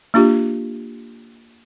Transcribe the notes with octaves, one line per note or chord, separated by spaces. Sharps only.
A#3 D4 F4 G4